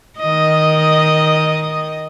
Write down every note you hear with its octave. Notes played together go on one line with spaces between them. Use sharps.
D#3 D#5